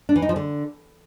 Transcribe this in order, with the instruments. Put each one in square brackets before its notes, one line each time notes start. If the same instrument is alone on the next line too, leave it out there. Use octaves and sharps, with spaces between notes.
[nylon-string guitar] D4
E3
D#4
F3
D3